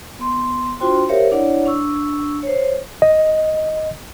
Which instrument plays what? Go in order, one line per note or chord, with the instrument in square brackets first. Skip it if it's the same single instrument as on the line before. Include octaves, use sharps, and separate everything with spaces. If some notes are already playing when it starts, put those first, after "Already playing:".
[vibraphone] B3 C6
D4 F4 F#4 C5 G5 C6
G4 A#4 C5 C#5 E5 F5
D4 E4 C#5 D5 F#5
D4 C#6 E6
C5 C#5
[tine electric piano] D#5